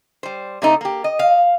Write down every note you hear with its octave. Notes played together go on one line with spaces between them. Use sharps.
G3 C5
C3 A3 D#4
A#3 G4
D#5
F5